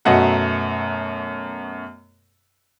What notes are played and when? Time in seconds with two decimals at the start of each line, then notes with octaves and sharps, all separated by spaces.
0.05 F#2 B2 A3 D#5 F#5 A#5